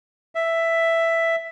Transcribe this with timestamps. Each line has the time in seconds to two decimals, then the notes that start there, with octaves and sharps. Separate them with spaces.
0.35 E5